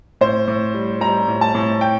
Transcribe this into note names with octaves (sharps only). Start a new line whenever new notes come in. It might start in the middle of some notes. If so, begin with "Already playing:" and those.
A2 C5
A2
G3
G3 A#5
A2
A5
A2
G5